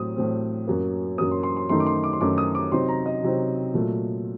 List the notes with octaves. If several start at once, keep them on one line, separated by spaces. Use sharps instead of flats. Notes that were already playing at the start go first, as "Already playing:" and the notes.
Already playing: A2 F#3 C4 D#6
A2 F#3 C4
F#2 F#3 A#3
F#2 F#3 A#3 D#6
C6
C6
C6
F#2 D#3 A3 D#4 C6
D6
C6
D6
C6
F#2 D#3 A3 D#4 D6
D#6
D6
C3 F#3 C4 D#4 C6
A#5
D#5
C3 F#3 C4 D#4
A#2 F#3 A3